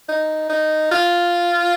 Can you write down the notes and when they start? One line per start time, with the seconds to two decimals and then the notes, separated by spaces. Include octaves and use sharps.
0.09 D#4
0.50 D#4
0.91 F4